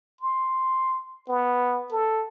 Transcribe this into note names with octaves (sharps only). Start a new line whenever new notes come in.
C6
B3
A4